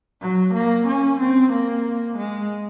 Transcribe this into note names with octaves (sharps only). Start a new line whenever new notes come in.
F#3
A#3
C#4
C4
A#3
G#3